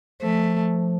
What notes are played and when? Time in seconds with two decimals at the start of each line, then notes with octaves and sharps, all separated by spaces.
0.22 F3 A3